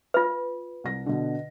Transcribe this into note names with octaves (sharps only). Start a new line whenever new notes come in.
F4 B4
C2 A#6
B2 D3